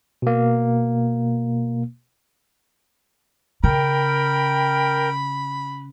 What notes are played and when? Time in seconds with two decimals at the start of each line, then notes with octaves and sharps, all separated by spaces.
0.22 B2 A#3
3.64 C#3 A#4 G5 B5